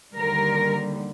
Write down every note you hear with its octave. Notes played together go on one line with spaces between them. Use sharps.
D#2 D3 G3 A#4